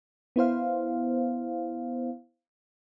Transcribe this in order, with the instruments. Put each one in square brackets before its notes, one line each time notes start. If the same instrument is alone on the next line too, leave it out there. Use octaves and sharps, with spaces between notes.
[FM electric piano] B3 E4 C5 F5